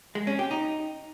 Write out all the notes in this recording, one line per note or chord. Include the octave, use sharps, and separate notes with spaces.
G#3
C#4
G4
D#4